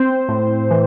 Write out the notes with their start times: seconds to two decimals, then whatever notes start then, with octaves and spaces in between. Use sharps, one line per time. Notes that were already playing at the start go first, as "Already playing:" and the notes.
Already playing: C4 C5
0.29 A2
0.71 E3